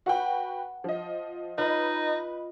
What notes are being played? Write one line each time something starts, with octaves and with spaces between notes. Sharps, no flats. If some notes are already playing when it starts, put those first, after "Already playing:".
F#4 B4 F#5 G5
F3 D#5
D#4 F4 B4 D#5